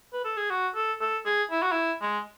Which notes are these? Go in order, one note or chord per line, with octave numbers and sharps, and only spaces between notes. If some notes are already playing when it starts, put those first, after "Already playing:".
B4
A4
G#4
F#4
A4
A4
G#4
E4
F#4
E4
G#3